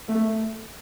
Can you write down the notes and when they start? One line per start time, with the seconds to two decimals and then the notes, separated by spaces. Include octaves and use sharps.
0.09 A3